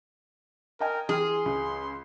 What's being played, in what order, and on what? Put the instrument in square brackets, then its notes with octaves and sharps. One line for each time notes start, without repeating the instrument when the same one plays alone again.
[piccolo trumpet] A#4 [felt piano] D#5 G5 G#5
[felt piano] E3 F6 [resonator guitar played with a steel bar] G#4 [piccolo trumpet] C6
[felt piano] C#2